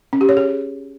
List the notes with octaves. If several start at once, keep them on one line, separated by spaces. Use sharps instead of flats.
C#4
G4
C#5
G#4